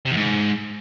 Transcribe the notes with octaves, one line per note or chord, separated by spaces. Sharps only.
C3
E2
G#2